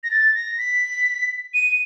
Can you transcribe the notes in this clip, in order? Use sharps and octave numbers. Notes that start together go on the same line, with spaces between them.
A#6
A6
A#6
B6
D#7